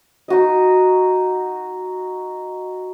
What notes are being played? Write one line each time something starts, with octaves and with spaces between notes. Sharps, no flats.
D#4 F#4 D#5